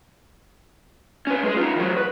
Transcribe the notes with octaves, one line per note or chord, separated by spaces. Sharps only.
C#4 B4
G#3 G#4
D#4 F4
D#3 F#3
B4